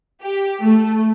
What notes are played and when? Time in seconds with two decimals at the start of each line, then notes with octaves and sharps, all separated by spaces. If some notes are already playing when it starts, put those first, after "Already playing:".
0.23 G4
0.62 A3